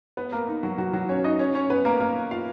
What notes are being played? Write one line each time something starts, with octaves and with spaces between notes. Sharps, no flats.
B3 B4
A#3 A#4
D#4
F#3 F#4
F#3 F#4
F#3 F#4
C#4 C#5
D#4 D#5
C#4 C#5
C#4 C#5
B3 B4
A#3 A#4
A#3 A#4
F4 F5